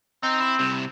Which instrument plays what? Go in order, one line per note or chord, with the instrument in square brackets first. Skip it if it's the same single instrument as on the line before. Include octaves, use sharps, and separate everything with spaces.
[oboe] C4 [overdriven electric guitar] D#4
[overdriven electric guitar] E4
C2 C3